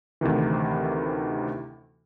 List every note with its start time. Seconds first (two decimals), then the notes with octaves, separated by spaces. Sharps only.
0.21 D2 C3 D#3 E3